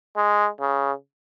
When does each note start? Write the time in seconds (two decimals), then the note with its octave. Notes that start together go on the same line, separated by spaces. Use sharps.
0.17 G#3
0.61 C#3